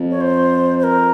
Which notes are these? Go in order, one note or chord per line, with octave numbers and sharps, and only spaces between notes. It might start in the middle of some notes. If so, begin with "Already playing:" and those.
Already playing: F2
C#5
C5
C5
A#4